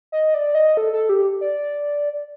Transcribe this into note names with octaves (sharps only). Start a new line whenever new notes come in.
D#5
D5
D#5
A4
A4
G4
D5